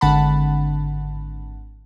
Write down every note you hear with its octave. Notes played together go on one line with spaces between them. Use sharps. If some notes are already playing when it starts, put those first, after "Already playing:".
G#1 D3 F#5 A5 B5